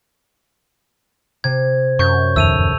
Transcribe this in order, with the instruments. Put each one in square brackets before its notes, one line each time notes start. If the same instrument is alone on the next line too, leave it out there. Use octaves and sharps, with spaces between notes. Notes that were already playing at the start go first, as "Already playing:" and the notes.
[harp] C3 [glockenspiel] G#6
[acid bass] F#2 [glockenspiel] C#6 G6
[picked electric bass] D1 F2 D#3 [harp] A4 E5 [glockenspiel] E6 D#7 F7